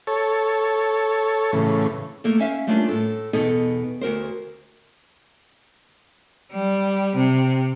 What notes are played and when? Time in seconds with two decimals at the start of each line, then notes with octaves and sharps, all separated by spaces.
0.07 A4 C#5
1.53 A2 C#3 E3
2.24 A3 A#3 A4
2.39 C#4 E5 F5
2.67 G3 A3 A#3 C#4 D4 F4
2.89 A2 A4
3.33 E2 B2 B3 D#4 A4
4.01 D2 F#4 A#4 C5
6.51 G3
7.15 C3